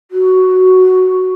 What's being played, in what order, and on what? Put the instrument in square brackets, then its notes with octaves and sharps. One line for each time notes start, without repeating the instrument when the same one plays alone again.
[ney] F#4